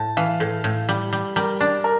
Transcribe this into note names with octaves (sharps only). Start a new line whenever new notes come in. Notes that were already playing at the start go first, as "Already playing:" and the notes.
Already playing: A2 A5
E3 F5
A2 A4
A2
G3
G3
G3 A#4
D4 D5
A#4